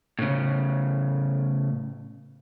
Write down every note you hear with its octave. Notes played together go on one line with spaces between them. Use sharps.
A2 C#3